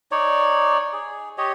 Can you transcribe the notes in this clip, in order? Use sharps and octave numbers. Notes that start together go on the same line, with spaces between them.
D#4 C#5 D5
G#4
G4 C#5 D#5